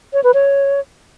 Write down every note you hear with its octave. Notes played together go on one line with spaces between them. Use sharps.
C#5
B4
C#5